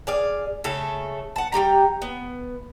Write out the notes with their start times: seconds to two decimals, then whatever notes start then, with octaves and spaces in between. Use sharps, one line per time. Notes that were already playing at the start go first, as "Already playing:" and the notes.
0.07 G#4 D5 F5
0.64 C#3 A3 A4
1.36 F#5 A5
1.52 G3 F#4 G4 A#5
2.02 B3